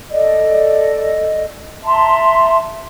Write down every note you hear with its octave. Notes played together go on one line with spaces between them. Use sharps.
A4 D5 D#5
E5 A5 A#5 C6